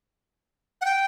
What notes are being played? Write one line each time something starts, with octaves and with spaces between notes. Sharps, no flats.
F#5
G5